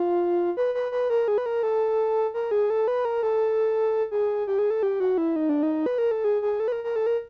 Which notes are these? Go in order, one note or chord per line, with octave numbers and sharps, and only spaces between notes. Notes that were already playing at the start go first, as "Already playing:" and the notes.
Already playing: F4
B4
B4
B4
A#4
G#4
B4
A#4
A4
A#4
G#4
A4
B4
A#4
A4
G#4
G4
G#4
A4
G4
F#4
E4
D#4
D4
D#4
B4
A#4
A4
G#4
G#4
A4
B4
A#4
A#4
A4
A#4